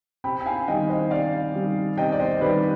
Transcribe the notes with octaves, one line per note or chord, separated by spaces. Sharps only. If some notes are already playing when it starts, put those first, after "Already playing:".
C3 G5 B5
G5
F5 G#5
D#3 G3 D#5 G5
C5 D#5
C3 D5 F5
D#3 G3
C3 D#5 G5
D5
C5 D#5
C5
D#3 G3 B4 D5